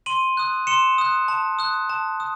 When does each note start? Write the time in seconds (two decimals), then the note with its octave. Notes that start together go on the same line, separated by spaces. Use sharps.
0.06 C6 D#7 F#7
0.37 D#6 F#6
0.67 C6 C#7 E7
0.98 D#6 F#6
1.28 A5
1.59 D#6 F#6
1.89 A5
2.20 D#6